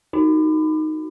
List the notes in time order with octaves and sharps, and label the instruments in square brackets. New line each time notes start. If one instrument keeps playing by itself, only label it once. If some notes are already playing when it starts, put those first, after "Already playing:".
[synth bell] D#4 F#4